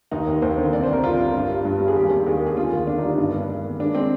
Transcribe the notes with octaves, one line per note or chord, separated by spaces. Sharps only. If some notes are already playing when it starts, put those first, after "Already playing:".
D#2 D#4
D#2
D#2 C5
D3
C2 D5
C5
C2
A#4
C2 F4
C2
G2
G3
G2
G3
G#4
D#2 G4
D#3
D#2 G#4
G4
D#2 G#4
D3 F4
D#2
D3 D4
G3 D#4
D4
G2
G2
G#3
D#3
G#3 D4
G#3 C4